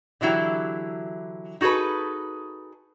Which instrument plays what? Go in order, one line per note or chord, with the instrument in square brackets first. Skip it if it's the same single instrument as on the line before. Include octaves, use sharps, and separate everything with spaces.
[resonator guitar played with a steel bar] D3 E3 F#3 E4 G4
D#4 F#4 G#4 A4 B4